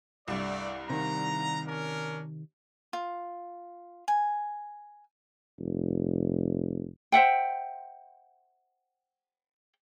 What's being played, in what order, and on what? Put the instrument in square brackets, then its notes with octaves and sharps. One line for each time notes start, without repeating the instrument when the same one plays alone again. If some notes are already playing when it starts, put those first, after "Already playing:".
[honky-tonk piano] C2 G2 [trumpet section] A3 D5
[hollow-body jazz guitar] C3 D#3 [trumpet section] A#5
[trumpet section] C#4 D4 A#4
[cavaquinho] F4
G#5
[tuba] F1
[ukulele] C5 E5 F#5 G5